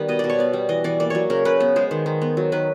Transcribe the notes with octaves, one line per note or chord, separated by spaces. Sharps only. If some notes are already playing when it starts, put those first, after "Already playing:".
Already playing: D#3 G3 B3 B4
B2 D#5
B2 D5
C#5
B3 D5
G3
E3 D#5
E3 D5
A#3 D5
F#3 C#5
C#3 A#4
C#3 B4
B3
G#3 C5
D#3
D#3
B3
F#3
D#3 B4